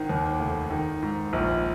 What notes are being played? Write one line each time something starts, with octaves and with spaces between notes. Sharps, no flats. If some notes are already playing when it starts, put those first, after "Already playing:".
Already playing: G#1 D#3
D#2
F1
D#3
G#2
A#1